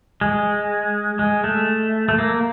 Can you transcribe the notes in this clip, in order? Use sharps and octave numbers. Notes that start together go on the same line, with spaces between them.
G#3
G#3
A3
A3
A#3